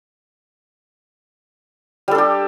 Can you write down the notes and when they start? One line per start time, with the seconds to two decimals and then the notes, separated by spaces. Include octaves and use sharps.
2.08 G3
2.11 A4
2.15 D4
2.18 G4